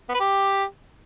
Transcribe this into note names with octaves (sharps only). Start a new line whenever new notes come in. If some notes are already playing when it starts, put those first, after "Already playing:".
B3
B4
G4